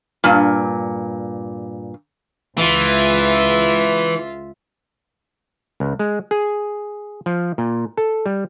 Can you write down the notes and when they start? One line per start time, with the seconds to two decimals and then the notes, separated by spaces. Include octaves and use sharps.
0.24 G2 A#2
2.58 C#2 E3 F4 E5
5.80 C#2
5.99 G#3
6.31 G#4
7.26 F3
7.58 A#2
7.97 A4
8.26 G3